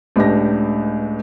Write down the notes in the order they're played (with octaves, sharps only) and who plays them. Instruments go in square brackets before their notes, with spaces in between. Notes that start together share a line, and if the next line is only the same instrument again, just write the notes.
[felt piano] C#2 A2 D4 G4 B4 A#6